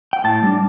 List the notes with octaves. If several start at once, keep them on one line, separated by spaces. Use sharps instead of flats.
G5
A2 A5
G3 D4